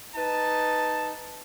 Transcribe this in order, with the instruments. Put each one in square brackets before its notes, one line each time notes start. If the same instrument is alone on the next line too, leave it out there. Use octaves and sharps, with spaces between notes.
[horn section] D#4 B4 A5